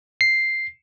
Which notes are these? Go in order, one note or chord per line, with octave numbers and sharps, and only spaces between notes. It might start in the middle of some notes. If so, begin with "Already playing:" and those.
C7